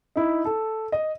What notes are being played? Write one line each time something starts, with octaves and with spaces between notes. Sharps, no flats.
D#4 E4
A4
D#5